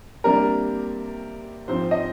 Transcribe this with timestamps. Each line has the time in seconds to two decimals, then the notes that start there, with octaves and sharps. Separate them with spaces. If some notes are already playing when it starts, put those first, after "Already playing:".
0.24 C3 G3 A#3 D4 A#4
1.68 G#2 F3 C4 C5
1.91 D#5